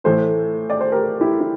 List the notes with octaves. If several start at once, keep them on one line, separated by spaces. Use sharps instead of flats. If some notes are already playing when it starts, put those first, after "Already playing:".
A2 E3 A3 A4 C5
D5
C5
G4 A#4
E4 G4
E4